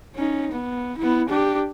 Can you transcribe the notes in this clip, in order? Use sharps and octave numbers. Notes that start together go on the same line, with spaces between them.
C#4 D#4
B3
B3 E4
D4 G4